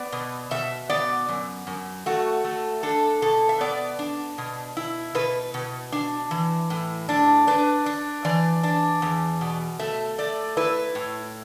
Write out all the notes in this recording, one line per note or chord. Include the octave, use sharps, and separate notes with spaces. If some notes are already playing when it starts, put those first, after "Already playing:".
Already playing: B3 D5
B2
B2 E5
B3 D5
F#2
F#2
A3 F#4
A3
D4 A4
B2 A4
E5
B3 D5
D4
B2
E4
B2 B4
B2
D4
E3
A2
D4
D4 B4
D4
E3 D5
D4
E2
B2
A3 E5
A3 D5
E4 B4
A2